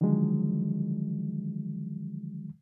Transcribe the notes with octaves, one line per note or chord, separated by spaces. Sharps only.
D3 D#3 F3 F#3 G#3